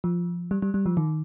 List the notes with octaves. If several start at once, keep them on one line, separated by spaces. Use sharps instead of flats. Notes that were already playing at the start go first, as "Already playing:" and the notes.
F3
G3
G3
G3
F3
D#3